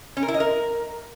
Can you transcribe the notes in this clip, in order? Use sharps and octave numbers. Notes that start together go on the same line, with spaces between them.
C#4
A#4
E4
D#5
A#4